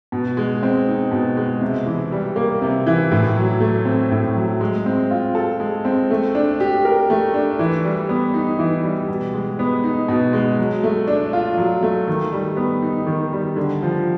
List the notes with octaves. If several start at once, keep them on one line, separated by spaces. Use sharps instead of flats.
B2
G#3
C4
D#4
B2
G#3
C3
E3
G3
A#3
C3
E3
A2
F#3
A3
C4
A2
F#3
G#3
C4
F4
A4
G#3
C4
A3
D4
G4
A#4
A3
D4
E3
G3
B3
D#4
E3
G3
B2
G#3
B3
D#4
B2
G#3
F#3
A3
D4
F4
F#3
A3
D#3
G3
B3
D#4
D#3
G3
D3
F3